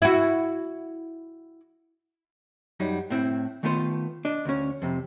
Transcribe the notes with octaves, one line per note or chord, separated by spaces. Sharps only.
E4 F#4
F#2 F#3 G3 D#4
A2 C4 E4
D#3 A3 B3 F4 B4 C5
D4 D#5
D2 C#4
F2 C3